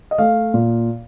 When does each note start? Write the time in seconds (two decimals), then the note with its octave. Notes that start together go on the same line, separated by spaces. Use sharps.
0.11 D#5
0.18 A3 F5
0.54 A#2